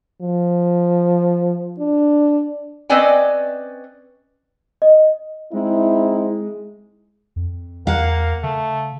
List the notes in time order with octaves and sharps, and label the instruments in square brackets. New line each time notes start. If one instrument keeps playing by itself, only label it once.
[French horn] F3
D4
[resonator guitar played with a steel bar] C4 C#4 B4 D5 D#5 G#5
[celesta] D#5
[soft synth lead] G#3 [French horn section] C4 D#4 E4
[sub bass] F2
[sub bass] E2 [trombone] A#3 [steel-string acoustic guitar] F5 F#5
[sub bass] C#3 [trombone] A3